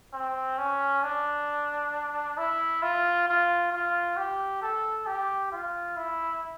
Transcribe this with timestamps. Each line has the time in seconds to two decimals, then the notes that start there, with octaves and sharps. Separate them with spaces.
0.13 C4
0.58 C#4
1.03 D4
2.38 E4
2.82 F4
3.28 F4
3.72 F4
4.17 G4
4.62 A4
5.06 G4
5.52 F4
5.97 E4